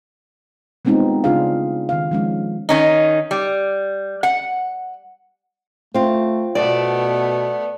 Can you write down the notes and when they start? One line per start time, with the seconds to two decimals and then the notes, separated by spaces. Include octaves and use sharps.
0.85 G3 G#3 B3 C4 D#4 F4
1.24 C#3 D4 F4 G#4 F5
1.89 D#3 F5
2.11 F3 G#3 C#4
2.69 D#3 C#4 D#4
3.31 G3
4.23 F#5
5.94 A3 C4 F4
6.55 B2 A3 B3 D5